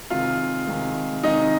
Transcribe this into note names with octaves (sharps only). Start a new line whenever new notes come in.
C3 D#3 G#3 F4 F5
C3 D#3 G#3
C3 D#3 G#3 D#4 D#5